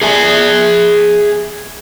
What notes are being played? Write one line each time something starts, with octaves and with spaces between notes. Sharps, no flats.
G#4 E5 G#5